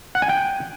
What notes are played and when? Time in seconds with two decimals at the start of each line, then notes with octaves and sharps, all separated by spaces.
0.15 F#5
0.22 G#5
0.29 G5